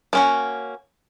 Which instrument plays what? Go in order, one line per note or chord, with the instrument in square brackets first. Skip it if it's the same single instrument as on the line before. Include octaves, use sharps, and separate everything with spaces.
[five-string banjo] A#3 C#4 F#4